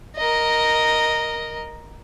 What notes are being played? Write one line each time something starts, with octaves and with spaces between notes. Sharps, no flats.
A#4 D#5